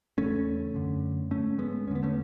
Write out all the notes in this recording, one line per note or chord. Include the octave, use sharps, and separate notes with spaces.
E2 C#3 A3 C#4
F#2 D3
G#2 A3 C#4
G#3 B3
E2 D3 B3 C#4
A3 C#4